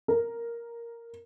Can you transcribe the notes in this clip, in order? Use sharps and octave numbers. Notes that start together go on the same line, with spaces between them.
A#4